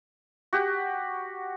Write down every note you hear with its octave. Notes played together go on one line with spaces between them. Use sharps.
F#4 G4